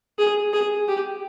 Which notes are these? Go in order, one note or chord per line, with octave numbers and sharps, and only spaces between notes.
G#4
G#4
G4